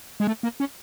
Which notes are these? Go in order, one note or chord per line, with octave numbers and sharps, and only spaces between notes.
G#3
A3
A#3
C#4